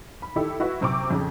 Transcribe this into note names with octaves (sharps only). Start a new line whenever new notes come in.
B5
D#3 E4 G4 A4
E4 F#4 B4 E5
F#2 C3 C4 C#6 D6
F2 C#3